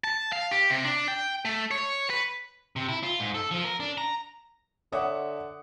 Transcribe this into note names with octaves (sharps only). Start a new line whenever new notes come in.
A5
F5
G4
C3
D4
G5
A3
C#5
B4
C3
E4
F4
G#2
A4
F3
A#4
D4
A#5
D3 C#5 E5 F#5 D6 D#6